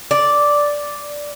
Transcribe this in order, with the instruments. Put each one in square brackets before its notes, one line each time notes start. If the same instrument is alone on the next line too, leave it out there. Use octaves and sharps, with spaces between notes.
[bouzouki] D5